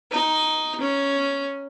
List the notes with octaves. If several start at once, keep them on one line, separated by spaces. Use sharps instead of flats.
D#4
C#4